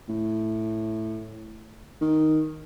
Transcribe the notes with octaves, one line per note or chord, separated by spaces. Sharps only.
A2
D#3